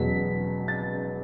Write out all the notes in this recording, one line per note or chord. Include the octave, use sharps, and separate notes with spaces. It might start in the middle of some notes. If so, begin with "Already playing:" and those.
Already playing: E1 E2 B2 F#3 B3 B6
A6